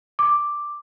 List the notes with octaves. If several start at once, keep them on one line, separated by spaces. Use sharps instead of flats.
D6